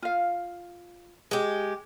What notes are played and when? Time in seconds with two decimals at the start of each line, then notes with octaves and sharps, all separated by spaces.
0.02 F4 F5
1.31 G#3 G4